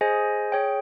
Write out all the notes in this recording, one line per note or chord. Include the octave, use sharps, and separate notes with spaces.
G#4 C5 D#5 G#5
G#4 C#5 G5